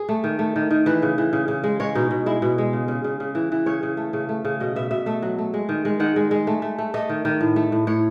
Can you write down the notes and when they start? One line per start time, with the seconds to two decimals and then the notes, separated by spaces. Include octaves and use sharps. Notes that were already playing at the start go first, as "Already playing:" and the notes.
Already playing: G#4
0.09 A3
0.24 D#3
0.39 A3
0.56 D#3
0.71 D#3
0.86 E3 B4
1.02 C#3
1.18 E3
1.33 C#3
1.48 C#3
1.64 G#3
1.80 G#3 C#5
1.95 B2 D#4
2.11 B2
2.26 G#3 E4
2.42 B2
2.58 G#3
2.73 C#3
2.88 C#3
3.04 C#3
3.20 C#3
3.35 E3
3.52 E3
3.66 C#3 C#5
3.83 C#3
3.97 A3
4.13 C#3
4.29 A3
4.45 C#3
4.60 B2 D#5
4.76 B2 E5
4.91 B2 E5
5.06 A3 E5
5.22 F#3
5.38 A3
5.54 G#3
5.69 D#3
5.85 G#3
6.00 D#3 F#5
6.16 G#3
6.31 G#3
6.47 A3
6.62 A3
6.78 A3
6.94 A3 D#5
7.09 D#3
7.25 D#3
7.41 A2
7.56 A3
7.72 A2
7.87 A2 C#5